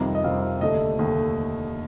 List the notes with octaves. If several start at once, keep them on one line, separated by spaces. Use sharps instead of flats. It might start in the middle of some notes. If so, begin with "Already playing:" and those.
Already playing: F2 C3 D#3 G3 C4 A#5
D#5
F2 C3 D#3 G3 C4 F5
F5
F1 D#2 D3 A3 D#5
F1 D#2 D3 A3